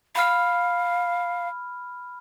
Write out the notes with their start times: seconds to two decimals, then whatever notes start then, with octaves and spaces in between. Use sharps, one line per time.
0.16 F5 B5 F6